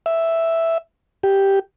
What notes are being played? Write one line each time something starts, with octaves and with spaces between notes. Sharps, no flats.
E5
G4